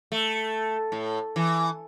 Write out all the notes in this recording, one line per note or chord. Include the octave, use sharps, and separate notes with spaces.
A3
A2
E3